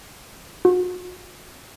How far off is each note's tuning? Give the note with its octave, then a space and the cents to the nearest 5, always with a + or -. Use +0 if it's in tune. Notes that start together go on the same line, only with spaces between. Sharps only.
F#4 -40